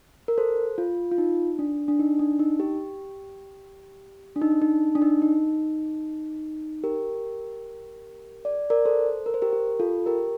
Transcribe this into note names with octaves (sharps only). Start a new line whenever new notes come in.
A#4
A4 C5
F4
F4
D#4
D4
D4
D#4
D4
D#4
G4
D4
D#4
D4
D#4
D4
D#4
D#4
G4 A#4
D5
A#4 D5
A4 C5
A#4
C5
G4 A#4
G4
F4 A4
G4 A#4